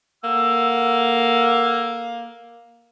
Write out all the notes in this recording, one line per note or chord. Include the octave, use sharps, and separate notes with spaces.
A#3 A4 F#5 E6